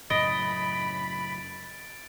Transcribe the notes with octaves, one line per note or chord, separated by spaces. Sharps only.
F#2 A2 C#3 D#5 B5 A6 D7